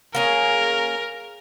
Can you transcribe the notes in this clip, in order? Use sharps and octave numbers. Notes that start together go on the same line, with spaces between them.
A#3 C#4 G#4 A#4